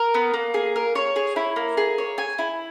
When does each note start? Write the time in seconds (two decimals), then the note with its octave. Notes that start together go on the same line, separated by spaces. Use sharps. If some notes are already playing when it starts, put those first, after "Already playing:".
Already playing: A#4
0.14 B3
0.34 A#3
0.54 G#4
0.76 A#4
0.95 C#5
1.16 G#4
1.36 E4
1.56 A#3
1.77 G#4
1.98 C#5
2.18 G#5
2.39 E4